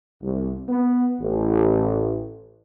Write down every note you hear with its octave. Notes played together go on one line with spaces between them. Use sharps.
C2
B3
A1